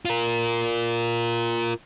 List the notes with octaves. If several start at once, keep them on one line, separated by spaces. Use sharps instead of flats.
F4 A#4